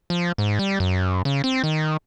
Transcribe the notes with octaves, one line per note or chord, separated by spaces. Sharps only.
F3
G#2
G3
F#2
C#3
C4
D#3